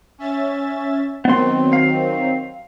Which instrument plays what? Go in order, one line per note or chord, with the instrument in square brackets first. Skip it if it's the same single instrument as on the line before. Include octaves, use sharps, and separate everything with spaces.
[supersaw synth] C#4 E5 A6
[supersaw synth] D#3 F#3 C4 [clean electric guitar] B3 C6
[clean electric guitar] F5